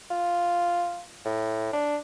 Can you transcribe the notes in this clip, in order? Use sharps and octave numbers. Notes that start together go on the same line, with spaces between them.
F4
A2
D4